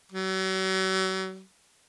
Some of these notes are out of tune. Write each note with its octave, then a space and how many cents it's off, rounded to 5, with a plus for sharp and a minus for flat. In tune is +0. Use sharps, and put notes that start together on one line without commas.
F#3 +40